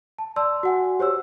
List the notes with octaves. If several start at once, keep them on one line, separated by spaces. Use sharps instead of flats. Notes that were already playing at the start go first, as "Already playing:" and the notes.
A5
D5 A5 C6 E6
F#4 F#5 G#5
G4 C5 C#5 E6